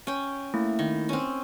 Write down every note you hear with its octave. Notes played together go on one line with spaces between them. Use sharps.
C#4 G5
A3 A#3 E4
D#3
C4 C#4